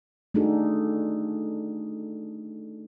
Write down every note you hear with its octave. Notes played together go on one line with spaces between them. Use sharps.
A3 D4 D#4 F#4 G#4 A4